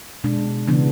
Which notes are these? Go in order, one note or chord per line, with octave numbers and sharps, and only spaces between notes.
B2 G#3 D4
C#3 E3 B3 D4